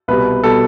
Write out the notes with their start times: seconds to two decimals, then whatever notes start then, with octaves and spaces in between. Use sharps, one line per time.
0.08 C2 B2 G3 B4
0.43 B2 G3 A4